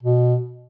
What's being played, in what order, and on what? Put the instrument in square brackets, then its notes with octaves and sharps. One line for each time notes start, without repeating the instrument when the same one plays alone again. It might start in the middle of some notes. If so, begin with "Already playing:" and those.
[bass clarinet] B2